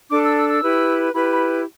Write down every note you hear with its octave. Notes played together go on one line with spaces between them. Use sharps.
D4 A4 D6
E6
E6
E6
E4 G4 B4
E4 G4 B4 B5
B5